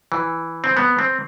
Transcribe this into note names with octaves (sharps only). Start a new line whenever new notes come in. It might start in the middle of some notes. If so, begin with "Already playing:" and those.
E3
C4
B3
C4